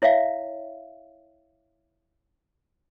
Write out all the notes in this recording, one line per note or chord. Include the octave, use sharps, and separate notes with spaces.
E4 C#5 E5 F5